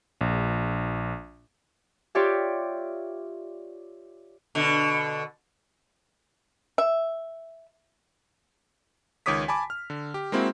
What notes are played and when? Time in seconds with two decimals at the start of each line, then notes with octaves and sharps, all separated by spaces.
0.21 A#1
2.15 F4 G4 C#5 D5 E5
4.55 B2 D3
6.78 E5
9.26 C#2 D#3 C#5 D6 D#6 B6
9.48 G#5 A5 B5 D6
9.70 F6
9.90 D3
10.14 G4
10.32 G#3 A#3 C4 E4 F#4